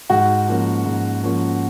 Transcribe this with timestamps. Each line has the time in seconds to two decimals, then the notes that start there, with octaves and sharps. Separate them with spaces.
0.10 G#2 F#4
0.48 F3 A#3 C#4
0.86 G#2
1.23 F3 A#3 C#4